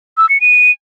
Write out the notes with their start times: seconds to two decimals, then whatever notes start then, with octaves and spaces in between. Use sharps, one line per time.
0.18 E6
0.29 C#7
0.41 D#7